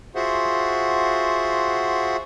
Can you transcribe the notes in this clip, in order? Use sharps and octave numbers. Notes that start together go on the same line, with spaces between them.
F4 F#4 G#4 C5 E5 F#5